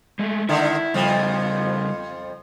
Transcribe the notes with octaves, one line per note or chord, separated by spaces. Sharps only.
G#3 A3
D3 D#3 E4 E5
F2 C#3 F3 G3